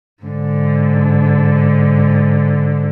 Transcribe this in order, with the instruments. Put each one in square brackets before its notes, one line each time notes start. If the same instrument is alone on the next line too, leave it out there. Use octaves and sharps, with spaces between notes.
[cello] G#2 D3